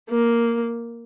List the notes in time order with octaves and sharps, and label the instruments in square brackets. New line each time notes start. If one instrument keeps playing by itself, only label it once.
[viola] A#3